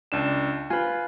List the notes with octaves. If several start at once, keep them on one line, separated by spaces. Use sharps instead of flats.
C#2 D4 E7
F4 B4 G#5